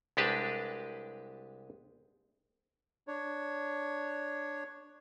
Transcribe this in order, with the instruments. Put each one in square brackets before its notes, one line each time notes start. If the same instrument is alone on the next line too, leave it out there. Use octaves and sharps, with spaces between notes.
[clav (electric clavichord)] C2 G#3 D4 G4 B4 A5
[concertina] D4 C#5